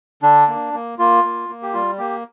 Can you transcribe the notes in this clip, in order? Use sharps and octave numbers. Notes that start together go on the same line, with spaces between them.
D3 D4
A#3
A#3
A#3 F4
A#3
A#3
G4
G3 F4
A#3 G4